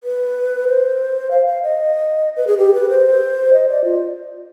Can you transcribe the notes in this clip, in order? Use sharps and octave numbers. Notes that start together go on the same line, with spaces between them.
B4
C5
F5
F5
D#5
B4
G#4
G4
B4
C5
D#5
D5
F4